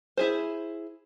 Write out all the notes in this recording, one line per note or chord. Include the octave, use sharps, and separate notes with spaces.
E4 G#4 C5